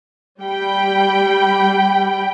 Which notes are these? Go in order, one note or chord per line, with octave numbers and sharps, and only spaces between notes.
G3 G5 B5